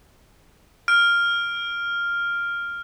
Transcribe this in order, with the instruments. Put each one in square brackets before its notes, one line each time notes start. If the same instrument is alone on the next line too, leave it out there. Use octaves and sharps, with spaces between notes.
[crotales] F6 D7